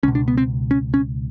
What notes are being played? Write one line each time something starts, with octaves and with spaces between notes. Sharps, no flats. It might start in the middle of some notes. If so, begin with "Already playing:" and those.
C#2 B2 C#4
D4
B3
C4
C#4
C#4